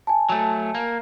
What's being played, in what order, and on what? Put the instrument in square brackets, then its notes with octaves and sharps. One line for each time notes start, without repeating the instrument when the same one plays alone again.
[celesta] G#5 A5
[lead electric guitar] F#3 A3
A#3